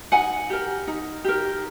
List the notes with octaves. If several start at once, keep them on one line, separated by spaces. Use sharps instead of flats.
D#4 F#5 G#5
G4 A#4
D#4
G4 A#4